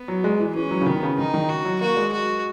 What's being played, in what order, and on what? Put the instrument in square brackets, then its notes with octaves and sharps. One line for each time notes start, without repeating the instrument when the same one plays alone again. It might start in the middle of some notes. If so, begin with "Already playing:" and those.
Already playing: [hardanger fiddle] B3
[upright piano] F#3
G#3
E3
[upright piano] E3 [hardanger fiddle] C#4
[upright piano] F#3
C#3
[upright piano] D#3 [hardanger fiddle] B3
[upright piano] C#3
[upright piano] D#3 [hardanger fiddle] D#4
[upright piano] D#3
[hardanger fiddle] F#4
[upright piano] F#3
[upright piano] A#3 [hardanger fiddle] F#4
[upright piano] G#3
[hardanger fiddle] F#4